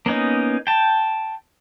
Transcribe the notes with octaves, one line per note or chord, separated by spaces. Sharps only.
A#3 B3 C#4 D#4
G5 A5